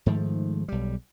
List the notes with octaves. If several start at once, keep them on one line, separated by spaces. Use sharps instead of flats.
G#2 D#3 F3 A3
B1 G3